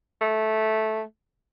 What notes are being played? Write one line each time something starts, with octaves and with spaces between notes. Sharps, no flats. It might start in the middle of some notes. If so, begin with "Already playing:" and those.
A3